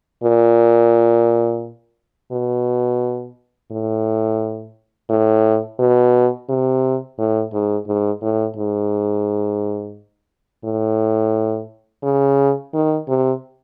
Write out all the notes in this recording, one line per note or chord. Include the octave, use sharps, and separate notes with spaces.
A#2
B2
A2
A2
B2
C3
A2
G#2
G#2
A2
G#2
A2
C#3
D#3
C3